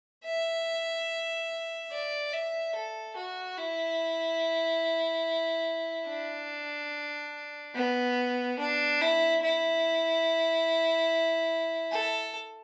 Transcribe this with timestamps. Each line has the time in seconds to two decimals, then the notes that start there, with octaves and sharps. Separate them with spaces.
0.24 E5
1.92 D5
2.33 E5
2.75 A4
3.16 F#4
3.58 E4
6.08 D4
7.75 B3
8.59 D4
9.01 E4
9.42 E4
11.92 A4